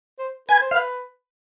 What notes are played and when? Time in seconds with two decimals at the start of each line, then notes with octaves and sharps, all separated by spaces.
0.19 C5
0.48 B4 G#5
0.61 C5
0.71 F5
0.74 B4